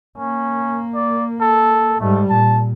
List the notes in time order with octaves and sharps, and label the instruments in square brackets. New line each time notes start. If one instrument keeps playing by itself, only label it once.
[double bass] A#3 [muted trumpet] C#4
[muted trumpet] D5
A4
[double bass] G#2 G3 [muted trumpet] A3
[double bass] A#2 [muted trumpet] A5